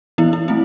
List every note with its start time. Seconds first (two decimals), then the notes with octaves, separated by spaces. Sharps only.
0.18 E3 B3 E4
0.33 E4
0.48 A3 C4 E4